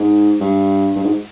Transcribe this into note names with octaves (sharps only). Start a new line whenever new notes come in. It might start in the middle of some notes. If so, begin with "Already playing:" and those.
Already playing: G#2
G2
G2
G#2